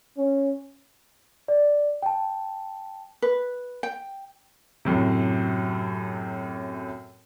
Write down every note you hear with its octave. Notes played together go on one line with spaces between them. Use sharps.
C#4
D5
G5 A5
B4
G5
F#2 A2 C3